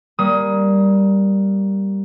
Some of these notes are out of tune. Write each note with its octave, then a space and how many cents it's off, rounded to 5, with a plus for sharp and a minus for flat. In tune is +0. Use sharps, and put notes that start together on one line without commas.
G3 +0 A#3 +10 D#6 +20